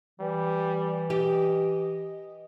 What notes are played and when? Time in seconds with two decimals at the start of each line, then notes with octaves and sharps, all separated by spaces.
0.20 E3 G3
1.10 G4 D#5